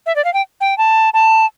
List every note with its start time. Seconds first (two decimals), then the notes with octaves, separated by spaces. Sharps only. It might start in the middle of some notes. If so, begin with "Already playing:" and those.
0.06 E5
0.16 D5
0.25 F5
0.34 G5
0.61 G5
0.78 A5
1.14 A5